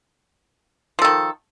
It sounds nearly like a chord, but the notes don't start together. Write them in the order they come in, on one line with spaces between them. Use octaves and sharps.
F3 A4 D#3